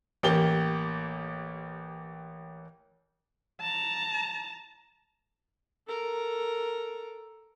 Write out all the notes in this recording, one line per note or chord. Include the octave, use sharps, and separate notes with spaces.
A1 A#3 G4 G7
A5 A#5
A4 A#4